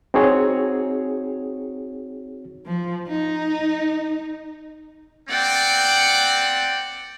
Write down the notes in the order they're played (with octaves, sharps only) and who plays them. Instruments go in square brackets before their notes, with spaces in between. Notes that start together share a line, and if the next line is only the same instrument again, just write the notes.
[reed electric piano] C4 D#4 F#4 G#4 C#5
[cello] F3
D#4
[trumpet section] C4 D5 [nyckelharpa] F#5 G5